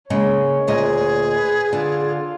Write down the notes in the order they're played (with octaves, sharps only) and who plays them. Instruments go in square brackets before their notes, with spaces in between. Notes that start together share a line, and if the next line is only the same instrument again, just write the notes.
[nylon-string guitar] C#3 G#3 A#3 [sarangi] C#5
[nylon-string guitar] D2 A#2 D#5 [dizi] G#4
[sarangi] B4
[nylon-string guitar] D3 [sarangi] F4